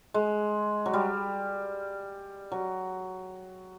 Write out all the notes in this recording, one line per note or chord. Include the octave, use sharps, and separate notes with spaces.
G#3
F#3
G3
F#3